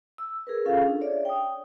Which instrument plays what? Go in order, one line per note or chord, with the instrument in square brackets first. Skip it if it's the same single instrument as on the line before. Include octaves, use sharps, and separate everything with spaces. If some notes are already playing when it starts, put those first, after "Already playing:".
[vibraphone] E6
G#4 A#4 B4
C#4 F4 G#4 A4 F5
D4
C#5 D5 E5
G5 D#6